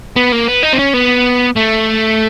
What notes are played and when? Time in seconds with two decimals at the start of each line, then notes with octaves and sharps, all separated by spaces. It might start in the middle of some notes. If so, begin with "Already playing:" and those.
0.16 B3
0.32 A#3
0.48 B3
0.63 D#4
0.73 C4
0.79 C#4
0.94 B3
1.57 A3